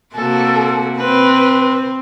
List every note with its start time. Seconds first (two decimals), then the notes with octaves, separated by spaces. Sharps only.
0.14 C3 A#3 F#4 A4
0.98 C4 B4